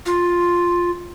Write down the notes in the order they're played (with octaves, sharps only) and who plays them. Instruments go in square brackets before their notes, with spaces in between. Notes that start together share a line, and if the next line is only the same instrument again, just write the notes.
[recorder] F4